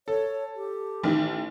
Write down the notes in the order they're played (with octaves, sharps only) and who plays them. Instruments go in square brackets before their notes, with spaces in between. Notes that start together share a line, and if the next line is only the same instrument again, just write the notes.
[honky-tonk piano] A4 [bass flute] C#5
[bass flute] G4
[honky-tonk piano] A1 D#3